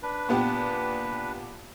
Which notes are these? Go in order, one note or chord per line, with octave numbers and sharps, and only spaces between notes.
D4 B4
A#2 B3 G4